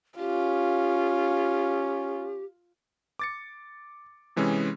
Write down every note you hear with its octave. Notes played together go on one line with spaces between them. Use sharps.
C#4 F4 G4
D6 A6 C#7
C3 E3 G#3 C#4 G#4